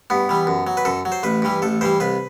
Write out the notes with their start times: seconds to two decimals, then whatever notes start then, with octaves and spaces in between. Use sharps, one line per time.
0.10 G2 B3
0.29 E3 G3
0.47 F#2
0.67 F#3
0.77 B4
0.85 F#2 A4
1.05 F#3
1.12 C5
1.23 A1 B4
1.42 G2 E3 G3
1.62 A1 A4
1.81 G2 E3 G3 C5
2.00 C2 B4